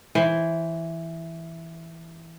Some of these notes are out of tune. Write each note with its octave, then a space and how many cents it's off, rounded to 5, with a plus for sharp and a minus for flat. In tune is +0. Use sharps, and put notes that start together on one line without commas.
E3 +0 C5 +0